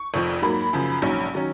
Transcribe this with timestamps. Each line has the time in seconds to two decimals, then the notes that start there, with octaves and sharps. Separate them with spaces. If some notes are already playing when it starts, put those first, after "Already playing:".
Already playing: C#6
0.14 F1 F2 F3
0.42 G#2 F#3 A#3 B5
0.73 F#2 C#3 F3
1.02 A#1 G#2 F#3 C#4
1.34 D#3 F#3 C#4